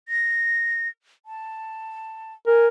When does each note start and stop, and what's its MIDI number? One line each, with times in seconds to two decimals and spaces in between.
0.08 0.88 94
1.26 2.34 81
2.47 2.68 70
2.47 2.67 80